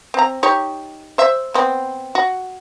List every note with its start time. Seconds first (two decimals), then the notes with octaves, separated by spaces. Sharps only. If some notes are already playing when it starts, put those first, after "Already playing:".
0.14 C4 A#5
0.43 D#4 G4 C#5
1.18 C5 E5
1.54 B3 C4
2.15 F#4